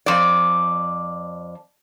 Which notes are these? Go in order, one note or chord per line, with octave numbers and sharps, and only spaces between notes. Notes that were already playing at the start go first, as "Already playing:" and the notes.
F2 D5